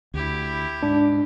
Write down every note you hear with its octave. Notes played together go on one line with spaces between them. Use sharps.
D2 E4 G4
G#2 D4